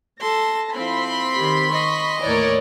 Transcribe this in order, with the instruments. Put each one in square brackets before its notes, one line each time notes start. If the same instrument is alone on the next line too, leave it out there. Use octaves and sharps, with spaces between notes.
[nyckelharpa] A4 C6 [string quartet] A5 A#6
[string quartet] F3 E4 [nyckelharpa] C4 [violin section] B5 C6 B6
[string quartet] D#3 G4
[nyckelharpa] D#5 [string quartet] C#6
[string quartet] D#2 A2 E3 [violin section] A#4 C#5 D5